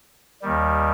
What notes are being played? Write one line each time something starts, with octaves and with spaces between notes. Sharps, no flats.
D#2 D#3 G3